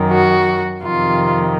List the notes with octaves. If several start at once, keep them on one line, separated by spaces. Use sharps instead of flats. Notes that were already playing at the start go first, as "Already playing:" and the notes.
Already playing: F#2 D#3
F#4
F2 C3 D#3 F4